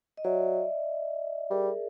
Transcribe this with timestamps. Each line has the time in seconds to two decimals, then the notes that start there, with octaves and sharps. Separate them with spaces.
0.17 D#5
0.24 F#3 D5 E5
1.50 G3 G#4 A#4